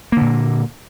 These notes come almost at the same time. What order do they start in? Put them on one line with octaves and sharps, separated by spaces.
A#3 D3 A#2